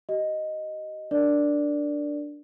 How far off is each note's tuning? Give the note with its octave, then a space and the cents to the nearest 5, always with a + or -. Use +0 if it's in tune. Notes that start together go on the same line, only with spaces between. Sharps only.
G4 -40 D#5 +0
D4 +0 A#4 +0 D5 +0